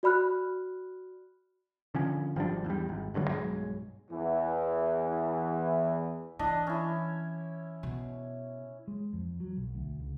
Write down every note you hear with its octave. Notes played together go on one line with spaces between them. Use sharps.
F#4 D5 B5 F6 F#6
D3 F3 C#4
G#1 F3 G3 D4
E2 G3
G#1
F1 G2 D3 F#3
B1 G2 F#3 G#3
E2 E3
E3 D4 D#5
C#4 E4
B2
G#3
F2
F#3
B1
D2
C#2